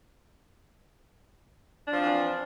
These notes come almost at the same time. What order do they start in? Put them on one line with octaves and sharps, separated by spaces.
D4 F3 C4 E3